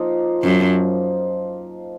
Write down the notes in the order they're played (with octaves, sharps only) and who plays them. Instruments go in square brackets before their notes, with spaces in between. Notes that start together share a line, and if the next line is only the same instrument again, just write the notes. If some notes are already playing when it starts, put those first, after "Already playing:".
Already playing: [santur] F3 A#3 D#4
[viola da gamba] F#2